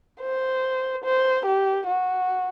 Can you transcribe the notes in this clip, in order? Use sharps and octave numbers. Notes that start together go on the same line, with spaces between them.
C5
C5
G4
F#4